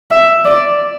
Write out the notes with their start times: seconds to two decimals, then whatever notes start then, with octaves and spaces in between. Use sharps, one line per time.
0.11 E5
0.45 D5